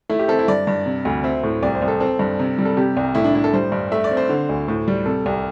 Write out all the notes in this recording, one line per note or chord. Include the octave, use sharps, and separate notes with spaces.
A3 E4
G4
C4 A4
E4
G2 D5
G2
C3
D2
C4 E5
A2
C2 D5
C5
C2
A4
C4 A4
G2
C3
G3
A4
C3 G4
C2
A2 E4
D4
A2 E4
A4
G3 C5
G2
A3 E5
D5
C4
C5
D3
D2
A2
G3
C3 A4
C2